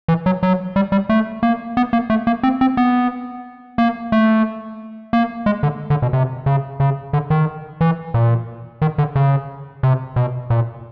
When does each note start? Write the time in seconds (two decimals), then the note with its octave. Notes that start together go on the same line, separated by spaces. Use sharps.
0.08 E3
0.26 F#3
0.43 F#3
0.76 G3
0.92 G3
1.09 A3
1.43 A#3
1.77 B3
1.93 A#3
2.10 A3
2.27 A#3
2.43 C4
2.61 C4
2.77 B3
3.78 A#3
4.12 A3
5.13 A#3
5.46 G#3
5.63 D3
5.90 D3
6.02 B2
6.13 C3
6.46 C#3
6.80 C#3
7.13 D3
7.30 D#3
7.81 E3
8.14 A#2
8.82 D#3
8.98 D3
9.16 C#3
9.83 C3
10.16 B2
10.50 A#2